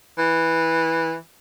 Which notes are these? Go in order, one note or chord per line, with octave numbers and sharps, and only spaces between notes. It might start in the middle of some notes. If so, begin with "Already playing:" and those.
E3